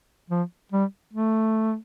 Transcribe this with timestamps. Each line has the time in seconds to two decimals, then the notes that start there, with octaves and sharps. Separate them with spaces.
0.30 F3
0.72 G3
1.13 A3